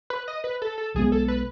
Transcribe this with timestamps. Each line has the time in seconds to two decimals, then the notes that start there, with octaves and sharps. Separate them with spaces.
0.10 B4
0.28 D#5
0.44 B4
0.62 A4
0.78 A4
0.94 B1 B2 G#3 B3 G#4
1.12 A4
1.28 B4